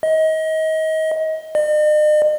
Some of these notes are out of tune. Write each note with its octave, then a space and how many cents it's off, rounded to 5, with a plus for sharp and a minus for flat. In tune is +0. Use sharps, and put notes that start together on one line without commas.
D#5 +30
D#5 -45